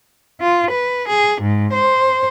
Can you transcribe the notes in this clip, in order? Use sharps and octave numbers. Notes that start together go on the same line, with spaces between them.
F4
B4
G#4
G#2
C5